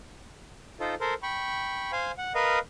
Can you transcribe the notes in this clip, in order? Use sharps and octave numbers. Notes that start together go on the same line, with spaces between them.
D#4 F4 A4 C5
A4 A#4 C5
G5 B5 C#6
C5 F5 G#5
F#5
A#4 B4 D#5 F5